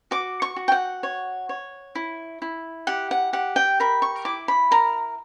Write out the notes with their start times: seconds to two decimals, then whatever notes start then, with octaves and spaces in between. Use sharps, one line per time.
0.11 F#4 D6
0.42 C#6
0.56 F#4
0.68 G5
0.72 F#5
1.03 C#5
1.49 C#5
1.95 E4
2.42 E4
2.87 G4 F#5
3.11 F#5
3.33 G4 F#5
3.56 G5
3.80 A#4 B5
4.02 C#6
4.25 E4 D6
4.48 B5
4.71 A#4 A#5